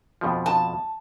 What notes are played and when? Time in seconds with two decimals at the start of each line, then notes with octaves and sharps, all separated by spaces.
0.21 F2 B2 F3
0.46 A5